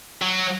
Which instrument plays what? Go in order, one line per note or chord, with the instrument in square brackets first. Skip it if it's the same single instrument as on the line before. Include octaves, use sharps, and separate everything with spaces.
[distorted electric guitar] F#3